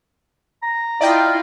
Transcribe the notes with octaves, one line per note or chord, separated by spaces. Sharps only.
A#5
E4 F4 D5 D#5 G5